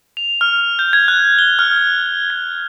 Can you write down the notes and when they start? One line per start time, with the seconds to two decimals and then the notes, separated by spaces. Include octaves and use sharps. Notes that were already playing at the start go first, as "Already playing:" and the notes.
0.17 F7
0.41 F6
0.79 G6
0.93 G#6
1.08 F#6
1.39 G7
1.59 F6
2.30 G#6